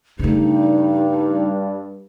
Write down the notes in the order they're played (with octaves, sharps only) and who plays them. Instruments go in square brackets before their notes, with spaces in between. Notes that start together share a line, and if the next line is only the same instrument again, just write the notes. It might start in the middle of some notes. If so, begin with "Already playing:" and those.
[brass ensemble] G2 [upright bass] C#3 A3 [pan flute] D#4